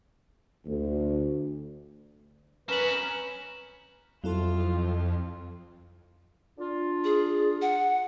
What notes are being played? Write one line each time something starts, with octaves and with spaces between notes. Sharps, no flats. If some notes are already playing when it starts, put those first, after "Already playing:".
D2
C#4 A#4 B4 E7 F#7
F2 F#3 E4 F4 A4
D4 F4
G#4
F#5